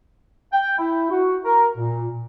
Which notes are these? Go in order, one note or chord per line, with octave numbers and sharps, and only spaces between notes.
G5
E4
F#4
A#4
A#2